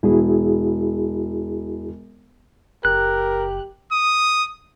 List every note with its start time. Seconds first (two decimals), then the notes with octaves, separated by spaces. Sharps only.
0.03 E1 E4 F#4 G#4
2.85 F#1 G4 A#4 F#6
3.92 D#6